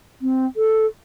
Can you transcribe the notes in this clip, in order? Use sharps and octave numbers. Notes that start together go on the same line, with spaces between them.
C4
A4